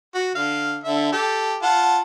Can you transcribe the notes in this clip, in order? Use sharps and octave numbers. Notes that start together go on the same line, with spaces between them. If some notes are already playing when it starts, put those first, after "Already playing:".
F#4
D3 F5
D3 E5
G4 A4
F4 F#5 A5